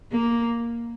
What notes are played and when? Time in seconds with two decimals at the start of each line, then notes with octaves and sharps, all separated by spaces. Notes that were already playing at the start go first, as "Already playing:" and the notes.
0.12 A#3